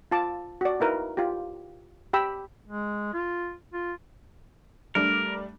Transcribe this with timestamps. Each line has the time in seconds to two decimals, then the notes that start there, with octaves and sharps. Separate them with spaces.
0.11 F4 A5 D6
0.61 F#4 D5
0.80 D#4 E4 A#4 B4
1.17 F4 G4
2.13 G4 G5 B5 D6 E6
2.68 G#3
3.14 F4
3.74 F4
4.95 G3 A3 D4 A#4